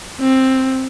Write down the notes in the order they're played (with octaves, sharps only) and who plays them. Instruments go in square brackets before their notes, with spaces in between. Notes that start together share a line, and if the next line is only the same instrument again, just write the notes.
[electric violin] C4